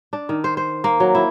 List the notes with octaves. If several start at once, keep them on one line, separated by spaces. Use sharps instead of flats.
D4
D#3
C5
C5
A#3
F#3
E4